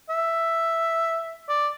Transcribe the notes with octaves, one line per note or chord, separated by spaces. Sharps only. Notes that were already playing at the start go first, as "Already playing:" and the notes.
E5
D5